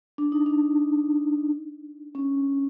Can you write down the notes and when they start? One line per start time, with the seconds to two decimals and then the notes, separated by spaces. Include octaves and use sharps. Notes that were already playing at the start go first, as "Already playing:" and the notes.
0.18 D4
0.32 D#4
0.46 D4
2.15 C#4